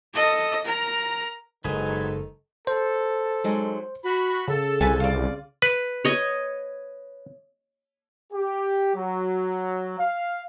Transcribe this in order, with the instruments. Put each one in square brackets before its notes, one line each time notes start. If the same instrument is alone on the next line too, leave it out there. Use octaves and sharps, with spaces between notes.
[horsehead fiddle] A4 D#5
A#4 A#5
[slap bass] F#1 [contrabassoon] G#2 [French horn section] D#3 A4 [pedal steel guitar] F#3 G#4 B4
[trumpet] A4 [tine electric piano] C5
[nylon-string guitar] F#3 G#3 D#4
[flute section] F#4 B5
[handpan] C#3 [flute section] A4
[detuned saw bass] C2 [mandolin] B4 G#5 A5
[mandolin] F4 D5
[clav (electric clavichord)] B4
[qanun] C#5 D#5
[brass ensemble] G4
F#3
F5